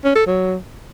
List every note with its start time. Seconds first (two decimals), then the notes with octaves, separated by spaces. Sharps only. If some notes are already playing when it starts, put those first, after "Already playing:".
0.04 C#4
0.15 A4
0.26 F#3